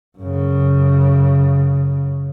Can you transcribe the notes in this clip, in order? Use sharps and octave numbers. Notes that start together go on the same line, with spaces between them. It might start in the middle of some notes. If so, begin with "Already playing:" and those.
F#2 C#3